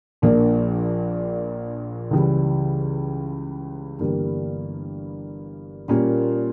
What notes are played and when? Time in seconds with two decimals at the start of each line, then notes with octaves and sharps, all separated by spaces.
0.22 A#1 A#2 F3 A#3 D4
2.11 C#2 C#3 E3 G3
3.99 G1 G2 E3 G3 A#3
5.88 A#2 G3 A#3 C#4 F4